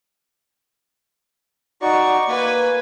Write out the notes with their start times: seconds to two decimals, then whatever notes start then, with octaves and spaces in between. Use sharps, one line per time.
1.82 D#4 F#4 D5 C#6
2.28 A#3 B4 G#5